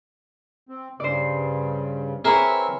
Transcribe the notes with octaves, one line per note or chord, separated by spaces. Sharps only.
C4
G2 C#3 C5 D5
C4 E4 G#4 A#4 B4 C#5 E5